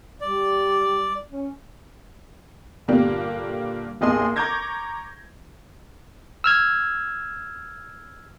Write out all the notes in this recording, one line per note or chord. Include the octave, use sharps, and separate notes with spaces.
G3 D5
C#4
G2 A#2 D3 A#3 D4 G4
A1 D#2 G#4 D#5 G#5 C6
A#5 C#6 D6 G6 G#6 A#6
E6 F6 G#6